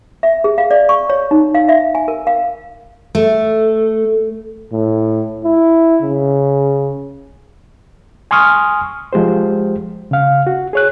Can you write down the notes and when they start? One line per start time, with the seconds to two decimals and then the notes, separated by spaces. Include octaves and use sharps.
0.23 E5
0.44 G#4
0.58 F5
0.71 D5
0.89 C#6
1.10 C#5
1.31 D#4
1.54 F5
1.69 E5
1.95 G#5
2.08 A#4
2.27 F5
3.15 A3
4.73 A2
5.45 E4
6.02 C#3
8.31 G#5 C6 C#6 D#6 F6
9.13 F3 G#3 G4 C5
10.11 C#3 F5
10.47 F#4
10.73 G#4 C#5 F#6